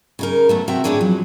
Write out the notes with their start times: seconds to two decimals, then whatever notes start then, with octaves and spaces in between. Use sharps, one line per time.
0.19 C#3 D#4 A#4
0.49 E2 F#3 A3
0.68 C3 F#4 E5 G5 A#5
0.84 D#2 A2 C3 D4 G#4 C#5
1.01 F#2 F3 F#3